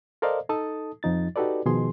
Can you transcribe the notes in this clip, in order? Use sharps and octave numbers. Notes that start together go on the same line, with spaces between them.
A4 A#4 C5 D5 D#5 F5
D#4 A4 A5 D#6
F2 F3 D#4 A6
D#4 F#4 G4 A4 B4 D5
B2 D#3 F3 G#4 C6